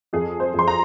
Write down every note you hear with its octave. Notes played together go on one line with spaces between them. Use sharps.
F2 G#4
C5
F2
C6
A#5